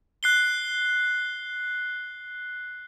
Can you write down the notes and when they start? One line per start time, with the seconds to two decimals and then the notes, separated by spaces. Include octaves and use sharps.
0.23 F#6 C7 G7